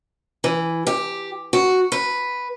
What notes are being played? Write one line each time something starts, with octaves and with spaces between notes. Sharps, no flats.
E3
G4
F#4
B4